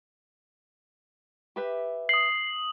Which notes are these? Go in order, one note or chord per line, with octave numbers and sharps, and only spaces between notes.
G4 B4 E5
D#6 C7 F#7